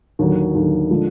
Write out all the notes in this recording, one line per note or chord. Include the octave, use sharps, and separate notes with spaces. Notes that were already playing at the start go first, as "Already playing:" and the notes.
D#2 D3 F#3
D#2 D3 F#3
D3 F3 G#3